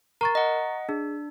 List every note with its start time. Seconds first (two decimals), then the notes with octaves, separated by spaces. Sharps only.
0.21 A#4 A#5 C#6 A6
0.35 D#5 F#5
0.89 D4 G#4